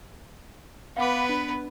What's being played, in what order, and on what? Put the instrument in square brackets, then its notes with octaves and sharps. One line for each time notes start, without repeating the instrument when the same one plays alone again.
[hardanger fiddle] B3 B4 [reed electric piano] F5 F#5 D6
[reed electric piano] D4